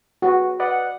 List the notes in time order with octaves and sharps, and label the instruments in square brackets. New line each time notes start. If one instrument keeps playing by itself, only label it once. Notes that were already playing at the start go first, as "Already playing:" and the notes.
[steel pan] F#4 [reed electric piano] G#4 B4
[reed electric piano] B4 D5 D#5 [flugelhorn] F#5